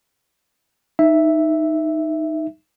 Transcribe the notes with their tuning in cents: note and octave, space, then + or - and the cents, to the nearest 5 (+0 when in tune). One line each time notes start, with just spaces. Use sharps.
D#4 +0 E5 +0